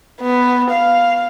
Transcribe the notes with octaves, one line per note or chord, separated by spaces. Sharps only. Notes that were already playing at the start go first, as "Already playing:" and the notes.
B3
F5